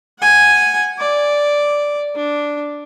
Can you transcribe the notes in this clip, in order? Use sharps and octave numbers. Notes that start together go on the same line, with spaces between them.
F#5 G#5
D5
D4